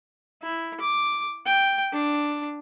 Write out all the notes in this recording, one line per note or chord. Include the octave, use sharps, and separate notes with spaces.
E4
D6
G5
D4